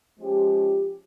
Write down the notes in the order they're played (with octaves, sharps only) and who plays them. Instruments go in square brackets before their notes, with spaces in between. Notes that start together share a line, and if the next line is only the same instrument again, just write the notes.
[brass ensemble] F3 G#3 C#4 G4